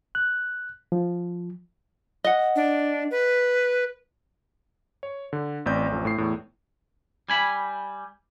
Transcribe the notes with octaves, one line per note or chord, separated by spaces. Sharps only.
F#6
F3
D#5 F#5
D4
B4
C#5
D3
A1 C4 D5 G6
A1 F2
A2 C7
E2 A2
G3 G#5 B5